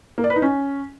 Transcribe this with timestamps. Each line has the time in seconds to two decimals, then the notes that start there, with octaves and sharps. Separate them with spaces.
0.18 A#3
0.24 D5
0.30 B4
0.36 D#4
0.42 C#4